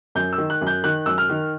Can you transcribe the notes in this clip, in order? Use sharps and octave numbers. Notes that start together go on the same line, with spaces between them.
F#2 G6
E6
D#3
F#6
F#2
G6
D#3 F#6
F#2 E6
F6
D#3